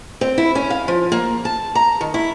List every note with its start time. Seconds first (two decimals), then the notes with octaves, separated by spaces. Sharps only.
0.21 C4
0.38 E4
0.55 C#4
0.70 F5
0.88 F3
1.12 A#3
1.45 A5
1.75 A#5
2.01 D#3
2.14 E4